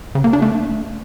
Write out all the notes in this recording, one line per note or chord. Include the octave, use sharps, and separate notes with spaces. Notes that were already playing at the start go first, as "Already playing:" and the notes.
C#3
A#3
D4
A3